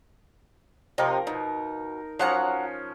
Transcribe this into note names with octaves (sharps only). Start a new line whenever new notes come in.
C3 F3 D#4 A#4
B2 D#4
F3 F#3 C#4 F#5 A#5